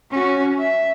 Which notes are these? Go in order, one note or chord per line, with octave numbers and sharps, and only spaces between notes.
C#4 F#4
E5